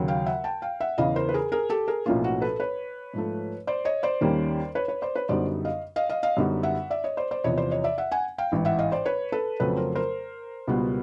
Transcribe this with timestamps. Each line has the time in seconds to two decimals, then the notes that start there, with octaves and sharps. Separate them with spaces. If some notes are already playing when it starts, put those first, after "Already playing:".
Already playing: D#2 C#3 F#3
0.08 F5 G5
0.26 E5 F#5
0.44 G5 A5
0.62 F5 G5
0.80 E5 F#5
0.98 E2 C#3 E3 D#5 F5
1.16 A#4 C5
1.29 B4
1.34 G#4 A#4
1.52 G#4 A#4
1.70 G4 A4
1.88 G#4 A#4
2.06 B1 A2 F3 A#3 C#4 F4
2.24 F#4
2.42 A4 B4
2.60 B4 C#5
3.14 G#2 F3 A3
3.67 C5 D5
3.85 C#5 D#5
4.03 C5 D5
4.21 D#2 D#3 G3 A#3 C#4
4.75 B4 C#5
4.88 B4 C#5
5.02 C5 D5
5.16 B4 C#5
5.29 F#2 D3 G3 B3 D#4 C5 D5
5.65 D#5 F5
5.96 D#5 F5
6.09 D#5 F5
6.23 D#5 F5
6.37 F#2 D3 G3 B3 D#4
6.63 E5 F#5
6.90 D5 E5
7.04 C#5 D#5
7.17 C5 D5
7.31 C5 D5
7.44 E2 C3 F3 C#5 D#5
7.58 C5 D5
7.71 C#5 D#5
7.84 D5 E5
7.98 E5 F#5
8.11 F#5 G#5
8.38 F5 G5
8.52 A1 G#2 E3
8.65 E5 F#5
8.79 D#5 F5
8.92 C5 D5
9.06 B4 C#5
9.32 A4 B4
9.60 F2 C#3 F#3 A3 C4 A4 B4
9.77 A#4 C5
9.95 A#4 C5
10.68 C#2 B2 G3 B3